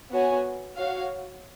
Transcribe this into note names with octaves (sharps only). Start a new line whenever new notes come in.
B3 F#4 C#5 G#5
F#4 C#5 F5